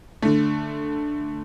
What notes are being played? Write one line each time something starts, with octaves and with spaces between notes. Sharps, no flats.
D3 A3